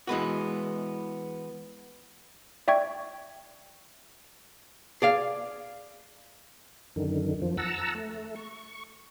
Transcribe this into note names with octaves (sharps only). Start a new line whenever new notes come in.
E3 G#3 B3 F#4
D5 E5 G5 C#6 G#6
G#4 D5 F5
F#2 D3 D#3
F2 F3
F#5 A5 A#5 E6
A3
C#6